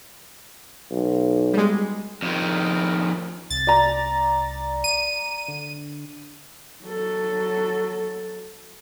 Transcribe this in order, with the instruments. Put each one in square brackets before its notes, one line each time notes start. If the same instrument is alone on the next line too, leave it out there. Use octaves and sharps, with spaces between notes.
[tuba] B1
[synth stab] G3 G#3
[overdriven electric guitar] F2 D#3
[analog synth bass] C2 [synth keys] A6
[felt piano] D5 A#5
[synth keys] D#7
[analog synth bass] D3
[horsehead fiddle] F#3 A4